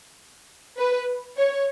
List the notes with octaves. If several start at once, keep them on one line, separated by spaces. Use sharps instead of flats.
B4
C#5